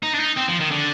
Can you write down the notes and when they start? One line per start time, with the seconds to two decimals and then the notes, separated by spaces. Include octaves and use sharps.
0.03 D#4
0.14 D4
0.19 D#4
0.36 C4
0.48 F3
0.60 D#3
0.71 D3